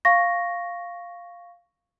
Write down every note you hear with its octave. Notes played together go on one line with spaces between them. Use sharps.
F5 C#6 A#6